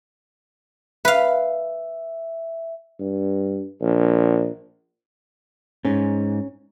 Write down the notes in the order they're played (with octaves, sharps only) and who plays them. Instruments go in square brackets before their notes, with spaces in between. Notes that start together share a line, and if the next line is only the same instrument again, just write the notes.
[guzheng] B4 F5 [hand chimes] E5
[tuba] G2
A#1
[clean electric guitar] G#2 [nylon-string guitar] C#4